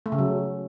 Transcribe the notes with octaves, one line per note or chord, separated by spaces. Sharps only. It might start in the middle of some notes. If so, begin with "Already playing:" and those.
A3
C#3
F#3